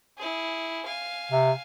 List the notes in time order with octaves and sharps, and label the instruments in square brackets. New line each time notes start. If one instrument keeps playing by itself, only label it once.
[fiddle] E4 G#4
F5 G#5
[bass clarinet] C3